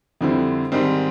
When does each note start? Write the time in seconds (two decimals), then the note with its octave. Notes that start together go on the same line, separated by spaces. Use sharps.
0.21 F2 D3 G3 C4 E4
0.72 G#2 D#3 G3 C4